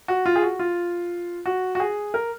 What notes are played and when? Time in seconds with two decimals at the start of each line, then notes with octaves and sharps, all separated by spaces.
0.08 F#4
0.26 F4
0.36 G#4
0.43 F#4
0.59 F4
1.46 F#4
1.75 F#4
1.80 G#4
2.14 A#4